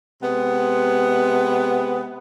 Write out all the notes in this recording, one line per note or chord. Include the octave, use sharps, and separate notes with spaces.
C3 G#3 B3